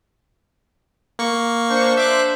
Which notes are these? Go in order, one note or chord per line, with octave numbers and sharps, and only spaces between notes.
A#3 C#6
D4 C5
E5 D6 F#6